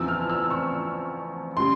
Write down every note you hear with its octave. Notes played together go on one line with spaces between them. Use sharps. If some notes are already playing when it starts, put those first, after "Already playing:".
Already playing: E2 C#3 F3 C4 E6
F6
E6
C#6
C#3 G3 C6